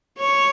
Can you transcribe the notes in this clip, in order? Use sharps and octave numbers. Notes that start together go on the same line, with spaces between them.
C#5